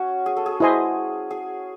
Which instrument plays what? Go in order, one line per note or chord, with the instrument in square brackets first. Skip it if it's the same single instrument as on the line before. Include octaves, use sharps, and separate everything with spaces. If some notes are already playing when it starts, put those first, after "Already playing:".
Already playing: [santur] C#4 F#4
G#4
A4
G#4
[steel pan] E4 C5 D#5 G#5 C6
[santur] G#4